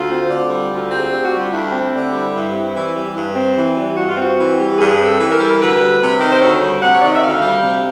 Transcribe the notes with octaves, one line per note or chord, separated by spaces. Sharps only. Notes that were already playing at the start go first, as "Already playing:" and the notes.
Already playing: D2 F4
C4
D3
G3
D2 F4
C4
G#4
D3 G4
F#4
G3
F4
D2 E4
C4
D3
G3
G2
C4
E3
G3
G2
C4
E3
G3
G2 F#4
F4
C4 F#4
E3
G3
G2 G#4
C4
A4
E3
A#4
G3 A4
A#4
D2 B4
G3
C3
D#3
C5
D2 C#5
G3
C3 F#5
C#5
D#3 D5
D#5
E5
D2 F5
G3
C3